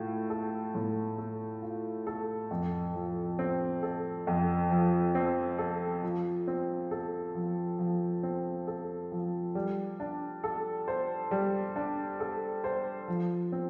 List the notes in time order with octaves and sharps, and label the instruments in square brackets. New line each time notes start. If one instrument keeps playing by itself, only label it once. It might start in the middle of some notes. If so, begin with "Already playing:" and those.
Already playing: [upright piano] A2 A3 F4
A4
A2
A3
F4
A4
F2
F3
C4
A4
F2
F3
C4
A4
F3
C4
A4
F3
F3
C4
A4
F3
G3
D4
A4
C5
G3
D4
A4
C5
F3
C4